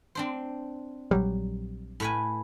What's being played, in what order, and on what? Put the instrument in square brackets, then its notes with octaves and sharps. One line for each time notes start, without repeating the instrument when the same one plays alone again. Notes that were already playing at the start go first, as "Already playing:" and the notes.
[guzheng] C4 D4 C5
[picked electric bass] A#1 F#3 G3
[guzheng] A2 B4 G#5